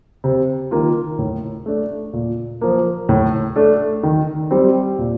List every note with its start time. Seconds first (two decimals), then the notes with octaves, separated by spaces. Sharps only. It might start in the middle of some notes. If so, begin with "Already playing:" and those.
0.24 C3
0.71 D#3 A#3 F4
1.19 A2
1.66 A3 D4
2.13 A#2
2.61 F3 A#3
3.09 A2
3.56 A3 D4 A4
4.03 D#3
4.51 G3 C4
4.99 A#2